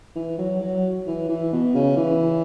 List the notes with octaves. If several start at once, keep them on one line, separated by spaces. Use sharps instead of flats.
E3
F#3
F#3
E3
E3
B2
C#3
E3